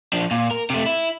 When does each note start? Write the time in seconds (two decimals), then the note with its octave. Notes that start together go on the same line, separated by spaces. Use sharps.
0.13 F3 D4
0.31 A#2
0.51 A#4
0.70 C3 A3
0.86 E4